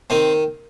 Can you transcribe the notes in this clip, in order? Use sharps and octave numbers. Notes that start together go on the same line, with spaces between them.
D#3 C4